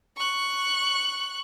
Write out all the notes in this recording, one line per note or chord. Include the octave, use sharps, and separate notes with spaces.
C#6 F#6